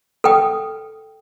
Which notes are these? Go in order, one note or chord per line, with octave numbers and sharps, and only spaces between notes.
A4 B4 G5 D#6